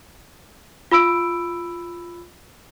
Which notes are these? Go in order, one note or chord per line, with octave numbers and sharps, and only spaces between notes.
F4 B5 E6 D7